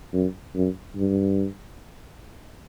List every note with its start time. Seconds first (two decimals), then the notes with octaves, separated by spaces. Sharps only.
0.13 F#2
0.55 F#2
0.96 G2